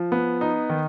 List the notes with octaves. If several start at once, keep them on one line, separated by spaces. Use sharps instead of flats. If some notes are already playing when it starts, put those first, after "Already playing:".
Already playing: F3
B3
D#4
D#3